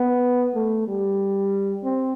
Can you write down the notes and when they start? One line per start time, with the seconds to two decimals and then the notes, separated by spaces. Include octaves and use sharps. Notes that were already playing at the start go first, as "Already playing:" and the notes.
Already playing: B3
0.55 A3
0.88 G3
1.84 C4